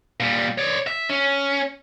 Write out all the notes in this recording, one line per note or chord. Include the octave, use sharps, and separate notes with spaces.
A#2 G3
C#5 D5
E5
C#4